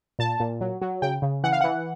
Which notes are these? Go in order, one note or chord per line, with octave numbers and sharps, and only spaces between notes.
A#2 A5
A#2
F#3
F#3
C#3 G5
C#3
E3 F#5
F5
E3 F#5